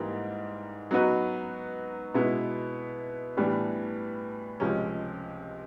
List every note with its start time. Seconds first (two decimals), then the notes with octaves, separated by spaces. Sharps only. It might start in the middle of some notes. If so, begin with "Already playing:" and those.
Already playing: G#2 E3 G3 A#3
0.91 F#3 B3 D#4 F#4 B4
2.14 B2 G#3 B3 E4
3.37 A2 E3 G3 B3 D4
4.60 C#2 C3 F3 G#3 C#4